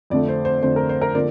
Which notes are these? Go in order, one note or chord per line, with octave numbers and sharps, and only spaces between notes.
F2 D3 A3 D5
C5
C5
F2 D3 A3 C5
A#4
C5
A#4
D3 F3 A#3 D5